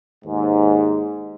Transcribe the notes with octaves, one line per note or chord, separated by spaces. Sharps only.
D#2 G#2